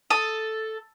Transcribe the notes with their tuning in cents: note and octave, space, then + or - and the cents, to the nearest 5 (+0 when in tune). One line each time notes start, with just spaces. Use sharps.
A4 +0 D#6 +5